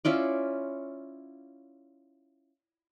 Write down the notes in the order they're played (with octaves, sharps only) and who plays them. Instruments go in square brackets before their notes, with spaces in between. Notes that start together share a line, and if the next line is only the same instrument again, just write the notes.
[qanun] C#4 E4 F4 D5